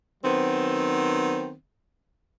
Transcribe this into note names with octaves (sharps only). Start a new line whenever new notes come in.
D#3 F#3 B3 C4